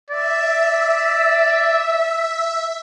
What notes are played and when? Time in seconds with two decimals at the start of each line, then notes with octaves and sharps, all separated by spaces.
0.10 D5 E5